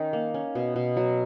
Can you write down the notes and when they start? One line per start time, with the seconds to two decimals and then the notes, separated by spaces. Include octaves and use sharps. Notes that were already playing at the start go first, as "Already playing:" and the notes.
Already playing: D#3 C#4 D#4
0.13 A#3
0.34 C#4
0.55 B2
0.76 B2
0.97 F#3